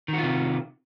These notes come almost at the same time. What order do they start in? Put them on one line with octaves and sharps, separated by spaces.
D#3 F#4 F4 C3